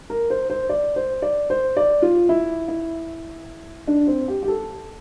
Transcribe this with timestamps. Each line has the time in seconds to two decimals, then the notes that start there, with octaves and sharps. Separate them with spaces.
0.10 A#4
0.30 C5
0.50 C5
0.69 D5
0.96 C5
1.22 D5
1.50 C5
1.77 D5
2.02 F4
2.29 E4
2.68 E4
3.87 D4
4.07 C4
4.28 G4
4.43 G4
4.48 A4